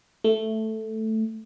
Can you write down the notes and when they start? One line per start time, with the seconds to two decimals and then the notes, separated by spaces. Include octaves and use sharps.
0.24 A3